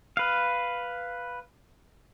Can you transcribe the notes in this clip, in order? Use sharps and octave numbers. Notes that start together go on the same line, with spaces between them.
B4 F5